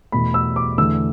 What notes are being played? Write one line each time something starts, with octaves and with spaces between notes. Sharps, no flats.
E2 B2 A3 B5
E6
D6
E2 D3 A3 E6